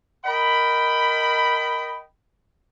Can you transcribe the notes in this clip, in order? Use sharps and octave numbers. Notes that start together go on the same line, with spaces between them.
A#4 D#5 G5 B5